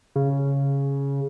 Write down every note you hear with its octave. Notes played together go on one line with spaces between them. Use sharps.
C#3